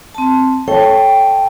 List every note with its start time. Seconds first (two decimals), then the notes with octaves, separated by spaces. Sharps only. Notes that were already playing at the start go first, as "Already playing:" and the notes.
0.15 C4 A5
0.68 A4 C#5 G5 A5